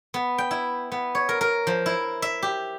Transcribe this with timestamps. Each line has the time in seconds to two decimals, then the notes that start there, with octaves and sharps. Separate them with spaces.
0.14 B3
0.38 G5
0.51 E4
0.92 B3
1.15 C#5
1.29 A#4
1.41 A#4
1.67 F3
1.86 E4
2.22 E5
2.43 G4